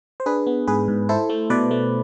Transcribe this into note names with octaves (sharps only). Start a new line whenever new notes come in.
C5
D4 G#4 B4
B3
G#2 G#4 B4
G#2
E4 A4 C5
A3
B2 B4 D5
A3